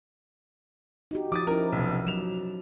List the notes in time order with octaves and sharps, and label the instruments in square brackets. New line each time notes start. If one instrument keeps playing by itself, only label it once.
[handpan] D#4 F#4 G4
[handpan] F3 D#4 [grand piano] D6 D#6 A6
[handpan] C#4 E4 [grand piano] A#4
[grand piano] F1 B1
[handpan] F#3 [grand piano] E7 F7